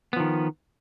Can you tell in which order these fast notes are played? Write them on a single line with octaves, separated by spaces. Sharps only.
B3 F3 D#3